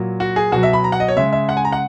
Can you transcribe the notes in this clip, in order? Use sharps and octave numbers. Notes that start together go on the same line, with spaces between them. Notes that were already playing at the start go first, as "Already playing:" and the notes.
Already playing: A#2 F#3
F#4
G#4
B2 F#3 F#4
E5
B5
A#5
F#5
D#5
C#5
C#3 G#3 E5
E5
F#5
G#5
A#5
F#5